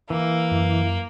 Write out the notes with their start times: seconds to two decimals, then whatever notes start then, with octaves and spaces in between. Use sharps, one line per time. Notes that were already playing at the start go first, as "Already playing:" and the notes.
0.10 E3 A#3
0.52 F#2